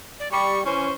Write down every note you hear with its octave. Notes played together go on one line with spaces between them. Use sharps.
D5
G3 C#6
E3 C#4 C5